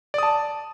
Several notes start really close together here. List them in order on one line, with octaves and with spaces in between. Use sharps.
D5 D#6 A5